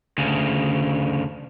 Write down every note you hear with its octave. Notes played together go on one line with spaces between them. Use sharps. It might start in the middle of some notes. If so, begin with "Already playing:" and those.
D2 C#3